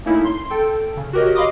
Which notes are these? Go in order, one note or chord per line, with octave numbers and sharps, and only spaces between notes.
A3 A#3 C#4 D#4 E4
C6
A4 G5
C#3
F#4 G4 A#4 C#5 D#5
D#5 F5 B5 C6 D6 D#6